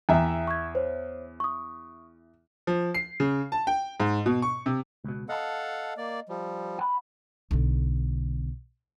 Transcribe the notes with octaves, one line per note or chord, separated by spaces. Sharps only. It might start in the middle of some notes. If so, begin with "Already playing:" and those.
E2 E5 G5 G#5 A#5
C#6 G#6
C5 C#5
C#6 D#6
F3
C7
C#3
A5
G5
G#2
B2
C#6
C3
C#2 B2
A4 D#5 F5 F#5 A5
A#3 D5
F3 G3
F#5 B5
B1 D3